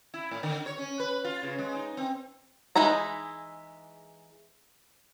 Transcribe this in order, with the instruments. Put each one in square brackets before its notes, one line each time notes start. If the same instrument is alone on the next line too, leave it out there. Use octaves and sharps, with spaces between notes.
[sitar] E4
A2
D3
C#5
C#4
B4
F4
C#3
G#3
D#4
C4
[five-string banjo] E3 G#3 D#4 E4 A#5